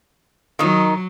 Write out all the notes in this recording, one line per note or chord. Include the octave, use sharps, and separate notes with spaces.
D#3 F#3 D#4